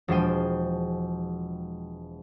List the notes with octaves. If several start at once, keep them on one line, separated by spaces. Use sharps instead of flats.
E1 F3 G#3 C5 G5 D#7